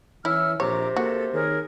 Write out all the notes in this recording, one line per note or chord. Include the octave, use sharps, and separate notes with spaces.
E3 C#4 E4 E5 E6 F6
A#1 C3 C#5 A#5 D6
A#3 F#4 A4
D#3 G#4 A#4 C#5